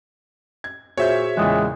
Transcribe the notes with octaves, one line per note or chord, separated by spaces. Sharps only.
G#6
A#2 F#4 G#4 C5 C#5 E5 G6
E2 A#2 C#3 G#3 G5 D#6 F#6